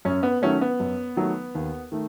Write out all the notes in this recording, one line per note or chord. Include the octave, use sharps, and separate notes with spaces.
F#2 C#4
B3
D#3 F#3 A3 C#4
B3
F#2
D#3 F#3 A3
D#2
D#3 A3